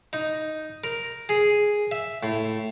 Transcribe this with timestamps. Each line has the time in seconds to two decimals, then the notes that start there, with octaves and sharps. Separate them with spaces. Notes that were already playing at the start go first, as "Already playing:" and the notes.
0.13 D#4
0.84 A#4
1.29 G#4
1.92 E5
2.23 A2